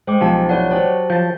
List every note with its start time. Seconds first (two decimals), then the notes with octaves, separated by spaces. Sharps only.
0.07 G#3 C5 G5 D6
0.21 B1 F3 D#4 G4 A5
0.49 E4 B4 C#5 D5 F#5
0.71 F#3 G4 C5 A5
1.10 F3 A5 G6